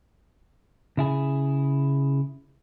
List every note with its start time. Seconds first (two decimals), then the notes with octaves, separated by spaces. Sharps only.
0.97 C#3 E4 G#4